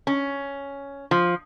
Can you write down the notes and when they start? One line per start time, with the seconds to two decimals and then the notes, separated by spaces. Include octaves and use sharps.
0.07 C#4
1.11 F3